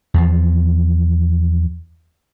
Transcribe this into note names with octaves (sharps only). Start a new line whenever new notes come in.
E2 F3